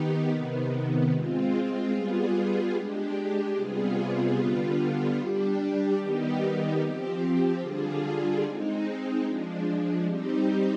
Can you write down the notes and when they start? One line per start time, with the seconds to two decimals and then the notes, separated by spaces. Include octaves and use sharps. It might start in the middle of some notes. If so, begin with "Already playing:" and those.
Already playing: D#3 B3 D#4 G4
0.29 C3 D#3 B3
1.11 G#3 C4 F4
1.92 G3 B3 F4 G#4
2.73 G#3 D4 G4
3.55 C3 G3 B3 F4 G#4
4.36 D3 G3 B3 F4
5.17 G3 D4 G4
5.98 D#3 G3 B3 D#4 G4
6.79 F3 C4 G4
7.60 D3 G3 D4 F4 G#4
8.42 G#3 C4 D#4
9.23 F3 G#3 D4
10.04 G3 C4 D#4 G4